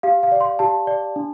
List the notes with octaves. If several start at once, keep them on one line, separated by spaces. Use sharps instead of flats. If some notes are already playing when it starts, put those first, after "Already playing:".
G4 F5
F5
D5
C6
G4 A5
D5
D4